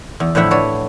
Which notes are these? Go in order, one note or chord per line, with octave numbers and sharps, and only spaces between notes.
E2
A2 D3 F3 E4 F#5 B5
D4 F#4 B4 C#5 D5